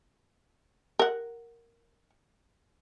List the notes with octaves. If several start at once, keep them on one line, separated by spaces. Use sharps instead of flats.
A#4 F#5